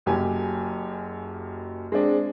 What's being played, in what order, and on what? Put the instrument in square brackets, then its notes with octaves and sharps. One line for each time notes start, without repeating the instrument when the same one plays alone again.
[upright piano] F#1 F#2 G4 G#5
G#3 C4 D4